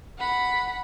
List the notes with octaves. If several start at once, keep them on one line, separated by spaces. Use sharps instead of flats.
F#5 B5